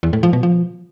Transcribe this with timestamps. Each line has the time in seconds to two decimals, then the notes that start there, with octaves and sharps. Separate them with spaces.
0.03 E2
0.13 A2
0.23 F3
0.33 B2
0.43 F3